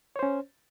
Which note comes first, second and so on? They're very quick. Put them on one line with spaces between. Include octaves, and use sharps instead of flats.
C#5 C5 C#4